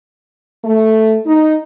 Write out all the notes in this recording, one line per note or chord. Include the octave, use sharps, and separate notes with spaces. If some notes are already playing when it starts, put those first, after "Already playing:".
A3
D#4